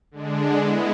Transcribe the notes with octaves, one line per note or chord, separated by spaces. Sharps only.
D3 G#3 D4
G#3 B3 E4